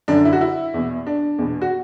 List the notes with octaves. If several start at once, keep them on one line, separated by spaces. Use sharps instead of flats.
F#2 D3 D4
E4
F#4
E4
E2 B2
D4
E2 B2
F#4